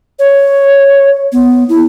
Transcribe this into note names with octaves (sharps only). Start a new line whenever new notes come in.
C#5
B3
E4